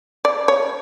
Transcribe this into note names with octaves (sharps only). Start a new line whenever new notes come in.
D5
C#5